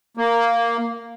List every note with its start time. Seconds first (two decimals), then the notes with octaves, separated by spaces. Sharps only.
0.17 A#3